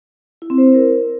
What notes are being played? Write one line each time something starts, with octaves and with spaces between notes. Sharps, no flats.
E4
C4
C5
E4
A#4